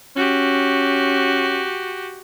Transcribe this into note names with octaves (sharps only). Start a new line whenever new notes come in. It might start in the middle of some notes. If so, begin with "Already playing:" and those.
C#4 F#4 G4